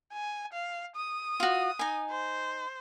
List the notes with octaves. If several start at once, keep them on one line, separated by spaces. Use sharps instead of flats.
G#5
F5
D#6
F4 F#4
D#4 G#5
C5